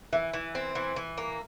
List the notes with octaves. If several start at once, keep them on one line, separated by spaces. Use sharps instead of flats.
E3 E5
E3
C4
E3
E3
A#3